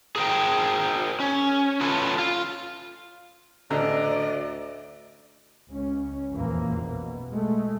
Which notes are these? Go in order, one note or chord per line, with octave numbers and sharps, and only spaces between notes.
G#4 A#4 C5 G5
C#4
F4 A4 B4 C#5
F4
A1 D2 D3 D5 D#5 A#5
C#2 C#4
F1 A#1 E2 E3 F3 A#3
B2
G#3 A3